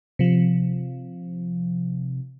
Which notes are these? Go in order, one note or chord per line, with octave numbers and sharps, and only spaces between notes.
C3 F3